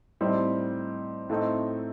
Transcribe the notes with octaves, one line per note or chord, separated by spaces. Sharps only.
A2 G3 C4 D#4
A2 A3 C4 D#4